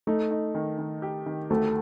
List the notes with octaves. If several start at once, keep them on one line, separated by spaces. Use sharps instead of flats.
A3 D#4
D#4
D#3
D#3
G4
D#3
D2 A3